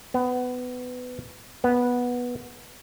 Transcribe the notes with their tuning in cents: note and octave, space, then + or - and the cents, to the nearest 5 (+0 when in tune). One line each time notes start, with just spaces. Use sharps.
B3 +20
B3 -10